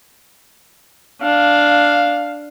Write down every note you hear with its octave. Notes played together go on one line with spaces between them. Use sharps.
D4 F5